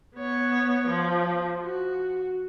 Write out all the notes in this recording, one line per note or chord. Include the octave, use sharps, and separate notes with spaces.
B3 C#5
F3
F#4